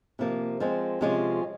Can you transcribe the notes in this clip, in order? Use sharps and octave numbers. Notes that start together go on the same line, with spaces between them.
C3 F3 A#3
F3 G#3 C4
C3 F3 G#3 C#4 F4